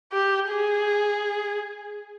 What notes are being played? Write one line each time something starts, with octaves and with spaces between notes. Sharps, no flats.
G4
G#4